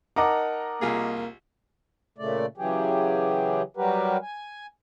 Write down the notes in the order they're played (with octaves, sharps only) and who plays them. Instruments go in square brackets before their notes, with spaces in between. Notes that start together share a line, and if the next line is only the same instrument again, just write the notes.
[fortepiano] D#4 [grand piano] A#4 F#5 A5 [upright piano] D#5 A#5 D6
[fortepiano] C2 F4 G#4 [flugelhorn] A#3
[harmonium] A#2 C#3 A3 D5
C#3 E3 F#3 G4 G#4
F#3 G3 F#4 G4 A#4 B4
G#5